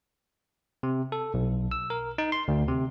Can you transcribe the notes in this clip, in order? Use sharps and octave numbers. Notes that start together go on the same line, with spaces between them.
C3
A4
B1
E6
A#4
D#4
C6
D2
C3